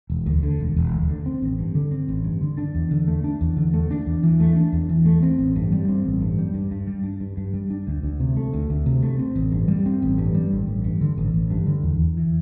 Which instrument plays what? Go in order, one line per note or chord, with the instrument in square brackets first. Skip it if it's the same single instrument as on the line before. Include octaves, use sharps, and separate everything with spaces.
[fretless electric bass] E1
D2
D3
E1
E1
D2
D3
C4
A1
G2
D3
C4
A1
G2
D3
D4
E2
D3
A3
D4
E2
D3
A3
D4
E2
E3
A3
D4
E2
E3
A3
C4
A1
G2
G3
C4
A1
G2
G3
G2
G2
G3
D4
G2
G2
G3
D4
D2
D2
C3
A3
D2
D2
C3
A3
C4
A1
G2
G3
C4
A1
G2
G3
A1
A1
G2
D3
A1
A1
G2
D3
E2
E2
E3